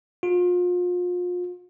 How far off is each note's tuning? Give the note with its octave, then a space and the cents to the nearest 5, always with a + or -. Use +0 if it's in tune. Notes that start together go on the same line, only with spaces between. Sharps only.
F4 +35